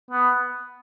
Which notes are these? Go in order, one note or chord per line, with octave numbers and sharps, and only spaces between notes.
B3